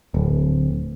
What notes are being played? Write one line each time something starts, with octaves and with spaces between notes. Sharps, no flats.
D1